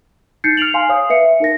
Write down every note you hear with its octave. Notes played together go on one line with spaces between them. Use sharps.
D#4 G6 A6 C7 C#7
F6 C7 D7 F7 F#7
F5 G#5 C6
C#5 F5 D#6 C7
B4 E5 C#7
D#4 A#4 A#6